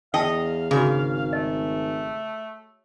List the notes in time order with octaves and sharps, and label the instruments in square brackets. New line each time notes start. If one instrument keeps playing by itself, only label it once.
[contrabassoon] E2 [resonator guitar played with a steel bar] D#5 [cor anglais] F5 [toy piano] G5 A5
[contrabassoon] G#1 [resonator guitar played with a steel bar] C#3 [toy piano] F#4 G#4
[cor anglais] A3 [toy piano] D#5